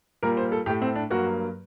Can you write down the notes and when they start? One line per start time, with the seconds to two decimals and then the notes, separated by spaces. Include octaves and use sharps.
0.23 A#2 G3 A#3 A#4
0.37 C5
0.52 A4
0.66 A2 A3 G4
0.82 C4
0.96 D4
1.10 G2 F#3 A#3 F#4